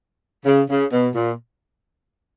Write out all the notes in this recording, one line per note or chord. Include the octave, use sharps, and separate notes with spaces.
C#3
C#3
B2
A#2